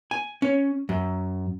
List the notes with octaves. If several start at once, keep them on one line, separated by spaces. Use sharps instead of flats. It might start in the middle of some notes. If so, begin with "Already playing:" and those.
G#5
C#4
F#2